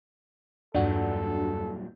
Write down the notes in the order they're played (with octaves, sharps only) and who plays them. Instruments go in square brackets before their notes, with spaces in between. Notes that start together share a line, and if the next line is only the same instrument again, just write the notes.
[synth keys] E2 G2 [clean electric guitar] A#2 F#3 G3 [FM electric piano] D4 F#4 [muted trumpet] A4